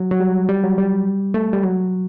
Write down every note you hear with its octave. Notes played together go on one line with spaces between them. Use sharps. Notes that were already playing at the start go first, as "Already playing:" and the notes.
Already playing: F#3
F#3
G3
G3
F#3
G3
A3
G3
F#3